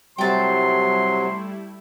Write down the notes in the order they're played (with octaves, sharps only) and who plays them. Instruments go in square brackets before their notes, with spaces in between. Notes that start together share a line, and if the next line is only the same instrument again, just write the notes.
[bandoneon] C3 F#3 [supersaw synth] G3 A3 E4 [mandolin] G5 A5 [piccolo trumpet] C6